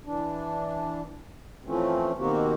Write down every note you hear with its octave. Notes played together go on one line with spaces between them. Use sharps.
E3 D4
E3 F3 A3 C4 C#4
B2 D#3 A#3 C4 F#4 G4